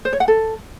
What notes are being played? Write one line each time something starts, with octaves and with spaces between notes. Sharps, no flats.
C5
C#5
F#5
A4